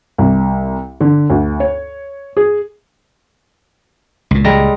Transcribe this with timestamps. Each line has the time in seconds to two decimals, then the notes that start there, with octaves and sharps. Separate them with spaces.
0.18 C2
1.01 D3
1.30 D2
1.60 C#5
2.37 G#4
4.31 C#2 A#2
4.44 G3 G#3 A#5